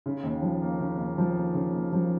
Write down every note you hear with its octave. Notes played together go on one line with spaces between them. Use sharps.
C#3
D#2
F3
A#3
C#3
D#2
F3
A#3
C#3
D#2
F3